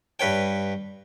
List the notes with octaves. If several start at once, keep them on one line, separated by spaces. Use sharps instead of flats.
G2 B4 C#5 G5